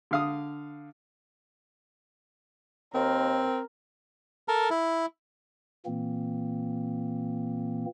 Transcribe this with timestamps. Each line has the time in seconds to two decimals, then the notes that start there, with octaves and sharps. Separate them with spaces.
0.11 D3 F5 D#6
2.94 D#2 C4 A#4
4.48 A4 A#4
4.70 E4
5.86 A#2 E3 A#3 C4